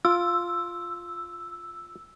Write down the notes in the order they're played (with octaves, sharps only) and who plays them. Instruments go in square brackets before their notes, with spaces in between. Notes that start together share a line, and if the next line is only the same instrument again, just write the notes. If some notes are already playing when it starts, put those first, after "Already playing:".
[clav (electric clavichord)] F4 [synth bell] E6